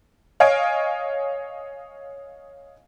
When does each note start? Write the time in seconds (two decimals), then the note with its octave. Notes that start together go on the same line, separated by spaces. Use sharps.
0.40 C#5 D#5 F5 G#5 G#6 D7